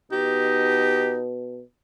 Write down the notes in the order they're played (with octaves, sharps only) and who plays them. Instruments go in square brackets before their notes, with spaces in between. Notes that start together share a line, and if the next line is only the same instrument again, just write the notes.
[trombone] B2 [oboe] D#4 [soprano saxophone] G4